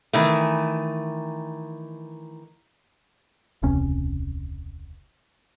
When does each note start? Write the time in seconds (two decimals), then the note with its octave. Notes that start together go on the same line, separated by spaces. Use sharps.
0.13 D#3 E3 A3
3.62 E1 C#2 C3 C#4